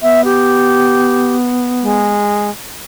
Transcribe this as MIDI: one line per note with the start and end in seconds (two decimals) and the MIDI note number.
0.03 2.20 59
0.03 0.21 76
0.25 1.35 67
1.82 2.50 56